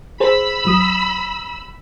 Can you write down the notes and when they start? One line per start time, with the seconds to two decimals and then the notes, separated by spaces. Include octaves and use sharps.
0.20 G#4 C5 B5 E6
0.65 G#1 F#3 D#6